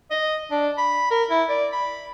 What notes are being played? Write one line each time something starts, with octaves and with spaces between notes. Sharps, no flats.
D#5
D4
B5
A#4
E4
D5
B5